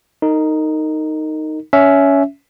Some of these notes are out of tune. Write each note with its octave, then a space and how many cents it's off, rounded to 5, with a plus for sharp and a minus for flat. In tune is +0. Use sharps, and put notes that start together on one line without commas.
D#4 +0 A#4 -35
C#4 +15 E5 +0